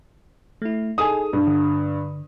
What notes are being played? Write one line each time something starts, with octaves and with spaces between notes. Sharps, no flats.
A3 E4
D#4 G#4 A4 G#5 D#6
G2
D3